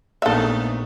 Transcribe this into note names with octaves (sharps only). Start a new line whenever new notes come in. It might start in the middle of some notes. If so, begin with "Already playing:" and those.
A#1 A3 B3 D#4 A4 E5 F5